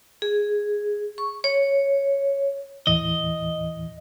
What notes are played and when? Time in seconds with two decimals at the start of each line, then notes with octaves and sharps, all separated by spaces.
0.22 G#4
1.18 C#6
1.44 C#5
2.87 D#2 A2 E3 D#5